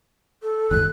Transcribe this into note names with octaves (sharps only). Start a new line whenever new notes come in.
A4
F#1 D#2 G#2 F#6